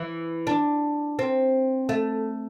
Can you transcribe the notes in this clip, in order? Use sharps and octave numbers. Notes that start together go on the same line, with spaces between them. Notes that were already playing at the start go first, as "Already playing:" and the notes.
Already playing: E3
D4
C4
A3